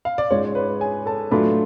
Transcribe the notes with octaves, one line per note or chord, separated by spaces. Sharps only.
F5
D5
G#2 G#3 C#4 F4 C#5
B4
G#4 G#5
A4 A5
A2 F#3 A3 D4 F4 B4 B5